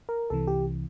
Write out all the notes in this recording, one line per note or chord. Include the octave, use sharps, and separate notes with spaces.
A#4
C2 C3 E3 A4
G4